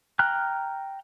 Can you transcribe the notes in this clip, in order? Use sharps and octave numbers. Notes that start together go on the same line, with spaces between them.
G5 A#5 F6 F#6